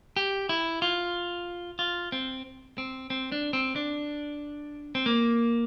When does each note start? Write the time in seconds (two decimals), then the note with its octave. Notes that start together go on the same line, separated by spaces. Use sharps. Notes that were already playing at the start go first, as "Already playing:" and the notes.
0.16 G4
0.49 E4
0.82 F4
1.79 F4
2.12 C4
2.78 C4
3.10 C4
3.32 D4
3.53 C4
3.76 D4
4.95 C4
5.06 A#3